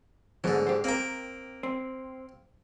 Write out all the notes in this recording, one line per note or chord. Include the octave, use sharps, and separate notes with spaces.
D2 G#2 D3 F#3 B3
G4 C5
A#3 C4 A#4 G5
C4